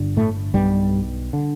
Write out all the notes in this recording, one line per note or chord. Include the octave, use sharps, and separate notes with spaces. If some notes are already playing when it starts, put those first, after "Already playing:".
Already playing: G1 G2 D3
A2 A3
B1 G2 B2 G3
D3